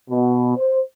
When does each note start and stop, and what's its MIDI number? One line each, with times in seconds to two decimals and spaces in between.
0.10 0.56 47
0.57 0.79 72